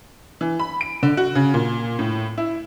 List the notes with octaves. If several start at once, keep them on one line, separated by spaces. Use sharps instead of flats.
E3
B5
D7
D3
F#4
C#3
A#2
A2
E4